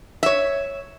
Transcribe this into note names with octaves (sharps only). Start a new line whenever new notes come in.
C#5 E5